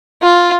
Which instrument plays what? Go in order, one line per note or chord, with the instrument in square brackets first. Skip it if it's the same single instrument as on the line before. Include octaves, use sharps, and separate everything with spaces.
[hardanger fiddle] F4